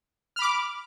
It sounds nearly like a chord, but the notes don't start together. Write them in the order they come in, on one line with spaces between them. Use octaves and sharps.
F6 B5 D6